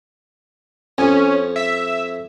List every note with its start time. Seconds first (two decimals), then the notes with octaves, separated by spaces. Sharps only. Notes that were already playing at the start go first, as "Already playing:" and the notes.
0.98 F2 C#4
1.56 E5